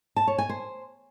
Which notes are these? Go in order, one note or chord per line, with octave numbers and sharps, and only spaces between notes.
A5
C#5
G#5
C5